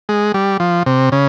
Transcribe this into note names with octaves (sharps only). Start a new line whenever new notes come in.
G#3
G3
F3
C3
C#3